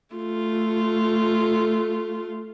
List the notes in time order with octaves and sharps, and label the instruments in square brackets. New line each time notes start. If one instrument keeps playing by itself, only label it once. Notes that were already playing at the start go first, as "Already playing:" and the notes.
[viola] A3 F4